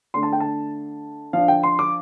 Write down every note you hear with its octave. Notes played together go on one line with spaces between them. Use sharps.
D3 A3 D4 C6
A5
G5
A5
F3 D4 F5
G5
C6
D6